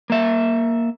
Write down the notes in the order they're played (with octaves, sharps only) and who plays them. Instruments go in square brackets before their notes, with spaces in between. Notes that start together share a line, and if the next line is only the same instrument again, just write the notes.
[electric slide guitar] A#3 E5